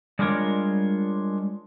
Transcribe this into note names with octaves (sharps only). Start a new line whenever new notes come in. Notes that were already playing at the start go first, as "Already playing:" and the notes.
G3 G#3 D4 F4 A#4 C#5